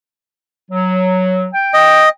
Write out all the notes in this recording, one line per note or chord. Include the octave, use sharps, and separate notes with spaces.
F#3
G5
D#5